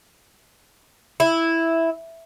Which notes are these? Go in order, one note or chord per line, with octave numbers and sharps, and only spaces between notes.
E4